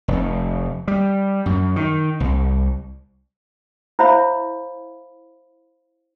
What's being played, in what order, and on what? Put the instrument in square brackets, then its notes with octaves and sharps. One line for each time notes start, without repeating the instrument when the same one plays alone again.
[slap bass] F1
G3
F#2
D#3
C2
[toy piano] E4 C5 C#5 E5 F5 B5